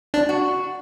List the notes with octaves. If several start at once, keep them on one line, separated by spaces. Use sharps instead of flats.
D4
F#4